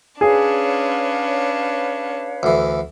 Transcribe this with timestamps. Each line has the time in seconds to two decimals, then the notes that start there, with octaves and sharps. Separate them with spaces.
0.21 C#4 D4 G#4 B4 C#5 F5
2.43 D2 E3